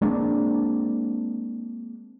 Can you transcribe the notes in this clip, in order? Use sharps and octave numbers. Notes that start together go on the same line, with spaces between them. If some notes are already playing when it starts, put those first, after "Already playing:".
G#3 A#3 C4 D4